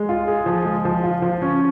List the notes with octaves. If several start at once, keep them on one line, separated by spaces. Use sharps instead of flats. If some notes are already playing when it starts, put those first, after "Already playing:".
Already playing: G#3
F4
G#4
F3
G#3
F3
F4
F3
C#4